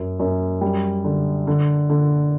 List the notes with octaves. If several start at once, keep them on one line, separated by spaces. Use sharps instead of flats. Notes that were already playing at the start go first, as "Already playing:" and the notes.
Already playing: F#2
F#2
G3
D3
D3
D3